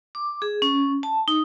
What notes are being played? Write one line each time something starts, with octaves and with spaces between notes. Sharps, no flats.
D6
G#4
C#4
A5
D#4